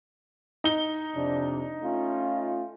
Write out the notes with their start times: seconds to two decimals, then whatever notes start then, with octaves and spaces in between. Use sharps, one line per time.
0.64 D#4 G7
1.15 F2 C3 D4
1.83 A3 C#4 F4